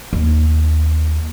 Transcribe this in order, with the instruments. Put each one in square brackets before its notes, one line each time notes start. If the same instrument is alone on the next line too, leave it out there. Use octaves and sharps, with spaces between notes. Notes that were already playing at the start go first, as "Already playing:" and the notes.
[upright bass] D#2